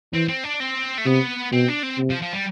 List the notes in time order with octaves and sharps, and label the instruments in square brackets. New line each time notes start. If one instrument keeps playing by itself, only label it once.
[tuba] E3 [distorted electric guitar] C4
[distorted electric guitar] C4
D4
C4
A3
[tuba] C3 [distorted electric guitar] B3
[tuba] B2 [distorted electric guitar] C4
[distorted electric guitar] D4
C4
[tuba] C3
[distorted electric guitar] F3
F3
G3